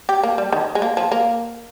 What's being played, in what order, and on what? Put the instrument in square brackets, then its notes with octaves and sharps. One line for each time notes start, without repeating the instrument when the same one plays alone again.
[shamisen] G4
A#3
G3
D#3
G#3
A#3
F3
A#3